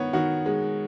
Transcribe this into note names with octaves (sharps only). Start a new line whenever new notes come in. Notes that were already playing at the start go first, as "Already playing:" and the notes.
Already playing: D#3 B3 C#5
D#3 F#4
G#3